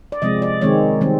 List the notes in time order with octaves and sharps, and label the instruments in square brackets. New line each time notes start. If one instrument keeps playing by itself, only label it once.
[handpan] D5
C3 F3 G#3 C4 D#5
D5
D#3 G#3 C4 C#5
D#3 G3 C4